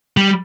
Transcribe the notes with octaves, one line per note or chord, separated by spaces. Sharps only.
G3